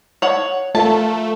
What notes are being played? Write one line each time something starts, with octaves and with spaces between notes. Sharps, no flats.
C#5 F#5
A3 F4 A#4 A5